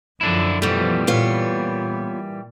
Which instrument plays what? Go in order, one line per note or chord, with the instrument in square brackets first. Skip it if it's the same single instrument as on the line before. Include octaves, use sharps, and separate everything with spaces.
[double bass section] F#2 F3 [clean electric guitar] D3 D4 E4
[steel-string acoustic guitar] B2 A3 [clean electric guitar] E3 G3 [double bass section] F3
[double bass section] A#2 [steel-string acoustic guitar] B3 F4 C#5